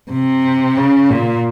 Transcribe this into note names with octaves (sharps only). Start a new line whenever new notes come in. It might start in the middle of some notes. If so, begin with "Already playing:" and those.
C3
C#3
A#2